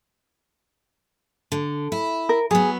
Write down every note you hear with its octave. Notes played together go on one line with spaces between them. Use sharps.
D3
E4
A#4
F#3 B3 G#4